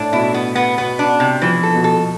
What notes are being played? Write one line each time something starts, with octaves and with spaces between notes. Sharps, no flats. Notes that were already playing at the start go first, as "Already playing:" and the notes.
Already playing: A2 D4
B2 E4
B3
B3
B2 B3
D4
C3
E3 F3
A4
B2
A4
B2